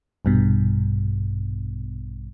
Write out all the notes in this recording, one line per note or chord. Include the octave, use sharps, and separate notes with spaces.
A#1 G2 B2